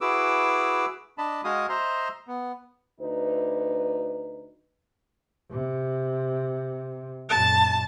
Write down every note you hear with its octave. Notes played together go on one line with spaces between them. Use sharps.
E4 F#4 G#4 B4 D6 E6
D4 D#5 A5 B5
G#3 F#4 D#5 F5 G#5 D#6
C5 D#5 E5 A#5 C6
B3
D2 D#4 B4
C3
F#2 A#2 A5